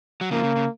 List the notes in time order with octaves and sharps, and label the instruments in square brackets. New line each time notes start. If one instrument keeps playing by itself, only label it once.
[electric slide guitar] F#3
[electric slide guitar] C#3 F3 [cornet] A#3
[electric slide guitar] C#3
C#3